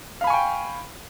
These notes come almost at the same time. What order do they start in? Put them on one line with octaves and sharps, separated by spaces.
F5 B5 G#5 C#6 G5